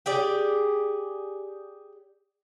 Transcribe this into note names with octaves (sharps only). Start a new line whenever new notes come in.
G4 G#4 D5